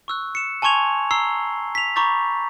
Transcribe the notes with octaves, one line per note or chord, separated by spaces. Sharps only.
C#6 E6 F#6
C#7 E7
G#5 A5 C6 C#6 G#6 F7
A#5 E6 C7 G7
B6 F7
A#5 B5 C#6 D6 G6 A6